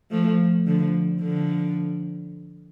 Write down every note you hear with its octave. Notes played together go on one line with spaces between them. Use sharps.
F3 A3
D3 F3
D3 F3